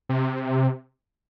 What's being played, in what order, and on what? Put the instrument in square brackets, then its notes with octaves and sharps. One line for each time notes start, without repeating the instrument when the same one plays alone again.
[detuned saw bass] C3